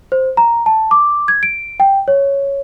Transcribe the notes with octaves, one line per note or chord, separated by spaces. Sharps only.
C5
A#5
A5
D6
G#6
D7
G5
C#5